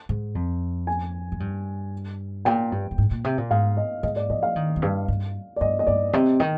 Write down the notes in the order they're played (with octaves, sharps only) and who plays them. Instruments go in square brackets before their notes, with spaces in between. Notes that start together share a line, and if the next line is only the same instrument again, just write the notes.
[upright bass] G#2
F2
[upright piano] G#5
[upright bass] G#2
G2
[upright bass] A#2 [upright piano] G5
[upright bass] G2
G2
G#2
A#2
C3
A#2
[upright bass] G#2 [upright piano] F5
[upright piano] D#5
[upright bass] G#2 [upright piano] D#5
[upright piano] D5
[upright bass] F3 [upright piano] D#5
[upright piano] F5
[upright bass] D#3
F2
G2
G2
[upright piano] D5
[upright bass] G2 [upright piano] D#5
[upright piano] D#5
[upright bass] G2 [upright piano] D5
[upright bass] C3 [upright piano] D#5
[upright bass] D#3 [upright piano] D#5